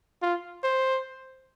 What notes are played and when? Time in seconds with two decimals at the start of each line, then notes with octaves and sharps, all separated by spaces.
0.22 F4
0.64 C5